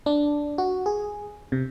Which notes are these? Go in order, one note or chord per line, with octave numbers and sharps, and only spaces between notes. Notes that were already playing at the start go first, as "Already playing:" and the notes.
D4
F#4
G#4
C3